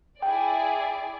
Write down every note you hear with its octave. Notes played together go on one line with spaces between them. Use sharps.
E4 G#4 D5 G5